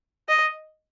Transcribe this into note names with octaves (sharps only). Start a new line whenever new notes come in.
D#5